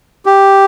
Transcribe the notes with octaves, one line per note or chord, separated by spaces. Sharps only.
G4